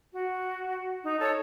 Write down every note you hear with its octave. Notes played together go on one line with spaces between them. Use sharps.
F#4
D#4
A4 C#5